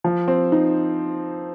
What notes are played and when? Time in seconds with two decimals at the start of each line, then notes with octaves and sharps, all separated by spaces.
0.04 F3
0.28 C4
0.52 D#4